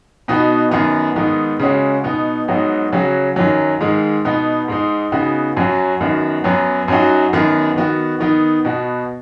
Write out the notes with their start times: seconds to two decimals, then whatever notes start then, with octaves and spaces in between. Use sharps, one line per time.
0.28 B2 B3 D#4 F#4
0.71 F#2 D#3 B3
1.16 G#2 D#3 B3 D#4
1.59 C#3 G#3 C#4 F#4
2.03 B2 B3 D#4
2.48 G#2 F#3 B3 D#4 F#4
2.92 C#3 F#3 C#4 F#4
3.36 F#2 D#3 F#3
3.80 G#2 D#3 G#3
4.25 B2 B3 D#4
4.68 G#2 G#3 D#4
5.12 C#3 B3 D#4 F#4
5.57 F#2 F#3 C#4 F#4
6.01 F#2 D#3 B3 F#4
6.44 F#2 F#3 B3
6.88 F#2 F#3 D#4 F#4
7.33 F#2 D#3 B3
7.76 D#3 B3 F#4
8.20 D#3 B3 D#4
8.65 B2 B3 F#4